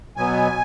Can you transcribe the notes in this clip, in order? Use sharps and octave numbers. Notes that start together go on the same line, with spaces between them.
B2 F#3 B3 G#5